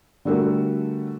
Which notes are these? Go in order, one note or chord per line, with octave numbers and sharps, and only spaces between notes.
D3 G3 A3 F#4 A#4